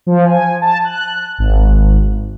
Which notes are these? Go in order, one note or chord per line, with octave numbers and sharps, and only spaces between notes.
F3
G#5
A5
F#6
G#1